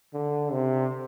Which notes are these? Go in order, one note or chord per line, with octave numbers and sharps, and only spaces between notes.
D3
C3